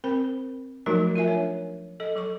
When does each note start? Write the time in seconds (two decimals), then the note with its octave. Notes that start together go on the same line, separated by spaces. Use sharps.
0.04 C4 A#4 C5 B5
0.86 F3 F#3 A3 D#4 F#4 A#4
1.16 F4 A#4 E5 G#5
1.28 D4 C#5
2.00 A4 D#5
2.16 F#3 A4 C#6